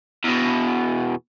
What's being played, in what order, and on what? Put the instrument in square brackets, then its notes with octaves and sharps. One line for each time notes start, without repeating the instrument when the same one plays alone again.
[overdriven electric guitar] E2 B2